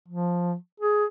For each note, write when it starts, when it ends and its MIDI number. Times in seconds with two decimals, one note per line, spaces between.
0.08 0.55 53
0.80 1.05 68